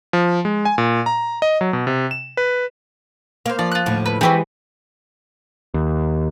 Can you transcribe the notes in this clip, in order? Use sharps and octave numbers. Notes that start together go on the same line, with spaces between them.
F3
G#3
G#5
A#2
A#5
D#5
F#3
B2
C3
E7
B4
A#3 C5 F5
F3 D5
F4 F#6
D#2 A2 D3
B4
E3 G#3 C4 F#4 G4 B4
D#2